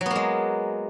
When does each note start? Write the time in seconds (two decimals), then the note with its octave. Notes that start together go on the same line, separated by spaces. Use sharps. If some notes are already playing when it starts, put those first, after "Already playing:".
0.01 F#3
0.06 B3
0.11 A#3
0.16 G#3